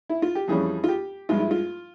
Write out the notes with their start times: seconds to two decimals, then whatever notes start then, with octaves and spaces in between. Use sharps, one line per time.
0.09 E4
0.22 F4
0.35 G4
0.48 F2 E3 G3 C#4 G#4
0.84 F4
0.89 G4
1.29 G2 F3 G#3 E4 F4
1.40 E4
1.51 F4